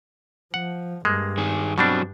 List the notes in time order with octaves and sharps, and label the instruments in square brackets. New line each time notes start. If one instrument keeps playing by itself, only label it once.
[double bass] F3 [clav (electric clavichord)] F#5
[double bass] G2 [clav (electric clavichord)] G#3 A#3
[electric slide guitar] D#3 G#4
[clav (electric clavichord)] B2 G3 D4 [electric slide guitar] F#3 C4